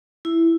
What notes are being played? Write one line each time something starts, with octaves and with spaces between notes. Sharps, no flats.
E4